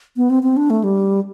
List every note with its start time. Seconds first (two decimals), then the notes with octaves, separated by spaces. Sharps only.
0.17 B3
0.30 C4
0.43 C4
0.57 D4
0.70 A3
0.84 G3